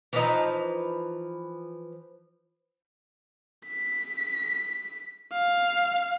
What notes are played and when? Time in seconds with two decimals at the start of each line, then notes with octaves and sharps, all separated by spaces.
0.13 E3 F3 D#4
3.66 B6
5.33 F5